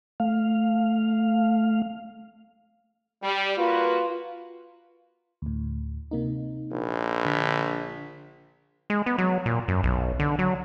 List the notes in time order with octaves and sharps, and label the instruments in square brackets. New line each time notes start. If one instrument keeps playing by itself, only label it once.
[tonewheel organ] A3 F5
[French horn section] G3
[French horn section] A#3 F#4 B4 [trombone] F4
[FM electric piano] D2 A2
C3 A#3 D#4
[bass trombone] A#1
[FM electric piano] D3 B6
[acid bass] G#3
B3
F#3
A#2
F#2
B1
D3
F#3